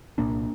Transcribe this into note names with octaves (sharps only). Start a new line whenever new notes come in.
C2 A#2 A#3 D4